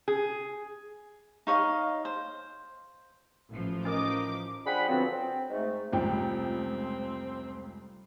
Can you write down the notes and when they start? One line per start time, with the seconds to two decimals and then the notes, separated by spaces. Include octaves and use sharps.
0.08 G#4
1.47 D#4 C#5 D#5 F5
2.05 C5
3.50 A1 F3
3.85 C#4 D#4 A#4 D#5 D6
4.66 F3 D4 G#4 F#5 G5 B5
4.89 D3 F3 F#3 B3 C4
5.12 C4
5.50 G#2 A3
5.92 F1 C#2 G3 C4 G5